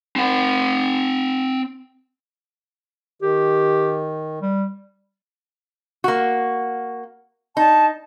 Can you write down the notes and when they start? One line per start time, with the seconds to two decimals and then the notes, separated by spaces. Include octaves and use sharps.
0.16 C4 F#5
3.22 D#3 G4
4.42 G3
6.04 A#3 F#4
7.57 D#4 A5